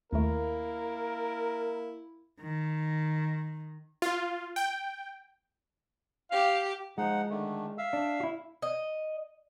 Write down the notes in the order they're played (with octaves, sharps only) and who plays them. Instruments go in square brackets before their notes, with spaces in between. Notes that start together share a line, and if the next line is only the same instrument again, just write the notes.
[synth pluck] D#2 A3 [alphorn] A#3 [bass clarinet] E4 [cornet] A#4
[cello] D#3
[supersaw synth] F4
G5
[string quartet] G4 [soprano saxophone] F5
[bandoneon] F3 D#4 F#5 [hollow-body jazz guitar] G#3
[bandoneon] D3 D#3 A3
E5 F5 E6
[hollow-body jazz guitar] D4
E4 F#4
[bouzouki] D#5